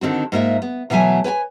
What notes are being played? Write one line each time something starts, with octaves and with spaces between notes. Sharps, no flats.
D3 D#3 C4 F#4
G#2 A#3 F4 E5
B3
B2 E3 F#3 A3 G#5
B4 C#5 G5 G#5